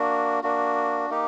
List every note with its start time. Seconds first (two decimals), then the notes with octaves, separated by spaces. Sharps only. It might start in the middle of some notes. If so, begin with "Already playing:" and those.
Already playing: A#3 D4 F#4
0.43 A#3 D4 F#4
1.10 A#3 D#4 G4